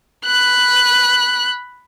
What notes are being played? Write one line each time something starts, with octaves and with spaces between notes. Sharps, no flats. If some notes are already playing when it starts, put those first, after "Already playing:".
B5 F#6